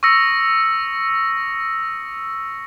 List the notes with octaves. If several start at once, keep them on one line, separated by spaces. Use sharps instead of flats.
C#6 D#6 E6 A#6 C#7